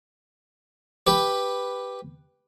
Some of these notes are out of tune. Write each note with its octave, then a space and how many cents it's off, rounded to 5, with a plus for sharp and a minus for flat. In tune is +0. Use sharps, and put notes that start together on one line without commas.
G4 +5 B4 +0